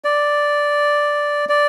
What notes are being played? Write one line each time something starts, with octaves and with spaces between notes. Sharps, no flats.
D5
D5